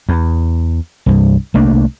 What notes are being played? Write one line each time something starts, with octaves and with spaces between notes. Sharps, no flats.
E2
C2 G2
C2 A3 A#3 D4